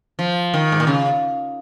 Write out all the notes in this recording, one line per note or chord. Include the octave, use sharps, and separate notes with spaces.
F3
D#3
G#2
A#2
C#3